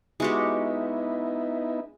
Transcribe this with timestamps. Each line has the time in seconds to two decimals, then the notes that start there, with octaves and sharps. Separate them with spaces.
0.20 G#3 B3 D#4 E4 F#4 G4